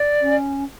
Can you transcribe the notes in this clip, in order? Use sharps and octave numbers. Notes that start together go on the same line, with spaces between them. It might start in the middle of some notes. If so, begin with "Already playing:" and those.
Already playing: D5
C#4